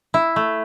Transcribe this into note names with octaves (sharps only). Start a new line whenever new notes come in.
E4
A3